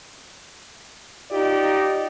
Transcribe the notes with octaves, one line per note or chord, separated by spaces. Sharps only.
D#4 F4 G4 D5 D#5